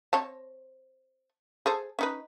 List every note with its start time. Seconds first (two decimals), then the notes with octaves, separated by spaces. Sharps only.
0.13 C4 C#5 A5
1.66 G#4 A4 C5
1.99 C#4 D#4 B4